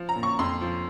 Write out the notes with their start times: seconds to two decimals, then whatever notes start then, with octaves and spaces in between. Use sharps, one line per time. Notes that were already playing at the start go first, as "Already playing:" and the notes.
Already playing: F3
0.09 A#5
0.16 A#2
0.23 C#6
0.39 F2 C6
0.61 F3